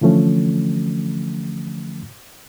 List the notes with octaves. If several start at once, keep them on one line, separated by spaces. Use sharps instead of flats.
D3 E3 F3 A3 C#4